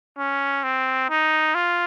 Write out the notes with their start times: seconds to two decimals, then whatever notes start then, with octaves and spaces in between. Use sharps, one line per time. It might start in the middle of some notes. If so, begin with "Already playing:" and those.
0.18 C#4
0.63 C4
1.10 D#4
1.55 F4